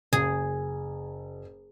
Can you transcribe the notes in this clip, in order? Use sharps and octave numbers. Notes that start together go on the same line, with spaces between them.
F#1 G#4